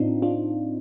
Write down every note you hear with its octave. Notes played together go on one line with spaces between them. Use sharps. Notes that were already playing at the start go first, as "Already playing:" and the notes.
Already playing: A2 C4 D4 D#4 F4
D4 F4